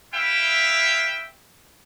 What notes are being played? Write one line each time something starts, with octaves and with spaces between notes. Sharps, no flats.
E4 B4 E5 F5 G5